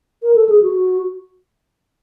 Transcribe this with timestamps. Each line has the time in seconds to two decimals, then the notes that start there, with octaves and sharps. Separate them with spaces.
0.23 A#4
0.35 A4
0.49 G#4
0.62 F#4